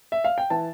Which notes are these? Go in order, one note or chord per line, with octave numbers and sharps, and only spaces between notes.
E5
F5
G5
E3 A5